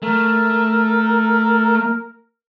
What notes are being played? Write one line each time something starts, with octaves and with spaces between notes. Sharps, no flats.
A3 A#4